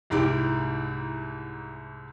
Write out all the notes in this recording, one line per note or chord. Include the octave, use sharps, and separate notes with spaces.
C2 G#2 E4 G4 D6